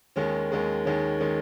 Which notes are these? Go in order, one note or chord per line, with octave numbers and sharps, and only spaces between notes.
D#2 D#3 G#3 C#4
D#2 D#3 G#3 C#4
D#2 D#3 G#3 C#4
D#3 G#3 C#4